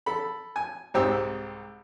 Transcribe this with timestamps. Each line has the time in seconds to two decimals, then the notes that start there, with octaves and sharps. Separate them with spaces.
0.06 A4 B5
0.56 G#5
0.94 C2 G#2 C4 G4 E6